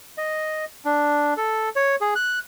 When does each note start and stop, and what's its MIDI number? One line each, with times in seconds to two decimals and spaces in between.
0.18 0.65 75
0.85 1.34 62
1.37 1.69 69
1.76 1.96 73
2.01 2.14 68
2.15 2.39 90